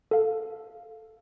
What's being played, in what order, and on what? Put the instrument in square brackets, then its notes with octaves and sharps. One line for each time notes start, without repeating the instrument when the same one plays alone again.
[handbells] A4 F5